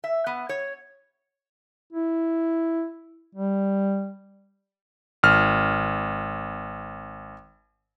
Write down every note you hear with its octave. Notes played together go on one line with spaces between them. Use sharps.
E5
B3
C#5
E4
G3
G#1 F6